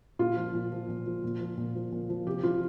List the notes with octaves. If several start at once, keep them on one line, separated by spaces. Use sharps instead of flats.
A#2 F4
F3
A#2
F3
A#2
F3
A#2
F3
A#2
F3
A#2
F3
C3 G4
F3 F4